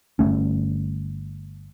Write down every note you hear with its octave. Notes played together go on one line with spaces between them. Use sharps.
G1 F#2 A3 C#4